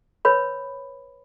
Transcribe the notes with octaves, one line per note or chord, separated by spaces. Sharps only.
B4 C#5 B5